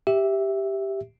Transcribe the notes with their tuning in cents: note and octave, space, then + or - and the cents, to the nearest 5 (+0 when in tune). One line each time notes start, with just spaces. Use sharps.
G4 +0 E5 +0